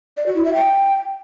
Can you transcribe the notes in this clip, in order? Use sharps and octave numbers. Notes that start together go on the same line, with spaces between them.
D5
F#4
E4
E5
G5